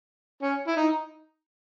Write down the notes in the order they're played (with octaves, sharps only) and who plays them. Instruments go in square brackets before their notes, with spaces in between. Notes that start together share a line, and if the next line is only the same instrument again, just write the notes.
[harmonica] C#4
E4
D#4